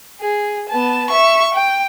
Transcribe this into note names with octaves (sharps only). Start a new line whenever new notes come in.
G#4
B3 A5
E5 C#6
G5